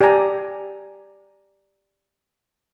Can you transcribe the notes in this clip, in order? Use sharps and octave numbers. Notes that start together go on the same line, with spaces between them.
G4 D5 G5 G#5 A#5